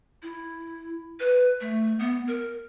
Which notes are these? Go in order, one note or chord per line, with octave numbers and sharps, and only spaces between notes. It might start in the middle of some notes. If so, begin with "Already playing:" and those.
E4
B4
A3
B3
A#4